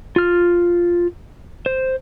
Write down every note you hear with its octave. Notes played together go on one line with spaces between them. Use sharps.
F4 F6
C5